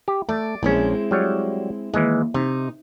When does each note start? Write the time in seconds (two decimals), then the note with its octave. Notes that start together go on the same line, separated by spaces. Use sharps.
0.08 G4
0.29 A3 D5
0.63 A#1 G#3 C4 C#4 E4
1.11 F#3 G3 C#5
1.94 D#2 E3 G#3
2.34 C3 D#4